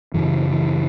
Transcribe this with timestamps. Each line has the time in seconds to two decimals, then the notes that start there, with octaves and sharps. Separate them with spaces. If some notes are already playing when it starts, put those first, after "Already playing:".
0.14 F#2 C#3 E3
0.51 E3